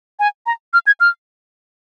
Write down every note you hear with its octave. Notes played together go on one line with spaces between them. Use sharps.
G#5
A#5
F6
G#6
F6